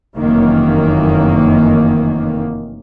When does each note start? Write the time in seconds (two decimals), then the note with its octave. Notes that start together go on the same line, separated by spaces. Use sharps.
0.17 F1 F#2 D#3 E3 A#3